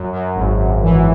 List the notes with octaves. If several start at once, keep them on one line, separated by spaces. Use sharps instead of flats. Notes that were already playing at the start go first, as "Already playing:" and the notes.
Already playing: F#2
F#2
G#1
G#1
E3